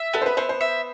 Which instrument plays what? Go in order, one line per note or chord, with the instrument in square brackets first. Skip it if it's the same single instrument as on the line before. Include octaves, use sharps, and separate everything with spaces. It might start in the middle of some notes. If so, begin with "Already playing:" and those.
Already playing: [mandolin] E5
[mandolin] B3 [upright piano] A4
[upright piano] C5
B4
[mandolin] B3 [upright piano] C5
[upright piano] C5
[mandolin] E5